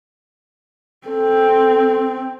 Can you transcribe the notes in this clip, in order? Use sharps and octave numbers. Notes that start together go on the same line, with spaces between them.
C4 A4